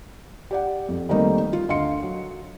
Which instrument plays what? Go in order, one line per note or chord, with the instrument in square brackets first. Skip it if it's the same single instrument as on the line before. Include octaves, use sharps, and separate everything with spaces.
[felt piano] G4 D5 F#5
F2
D#3 G3 A3 A#3 C4 D#4
F4
D2 D#5 F5 C6 C#7
F#3